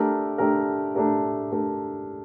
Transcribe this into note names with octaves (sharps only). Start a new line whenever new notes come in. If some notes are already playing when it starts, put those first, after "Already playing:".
Already playing: A3 D4 G4 A#4
A3 D4 G4 A#4
A3 D4 G4 A#4
A3 D4 G4 A#4